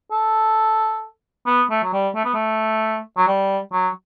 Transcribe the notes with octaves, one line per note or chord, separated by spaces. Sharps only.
A4
B3
A3
F#3
G3
A3
B3
A3
F#3
G3
F#3